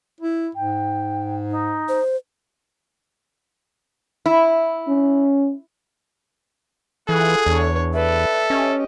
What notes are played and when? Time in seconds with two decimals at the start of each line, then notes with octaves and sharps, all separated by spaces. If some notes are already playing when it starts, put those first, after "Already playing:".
0.21 E4
0.55 G#2 G5
1.50 D#4
1.89 C5
4.26 E4
4.88 C#4
7.09 E3 F4 G#4 A4 F#5
7.46 E2 D4 C#5
7.93 A4 B4 D5 E5
8.50 C#4 G4 D#5